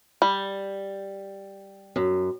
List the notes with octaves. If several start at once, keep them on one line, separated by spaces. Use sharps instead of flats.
G3
F#2